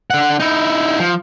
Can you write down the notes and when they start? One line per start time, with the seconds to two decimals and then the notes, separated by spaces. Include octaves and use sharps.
0.10 D3 F#5
0.40 D#4 E4
1.00 F3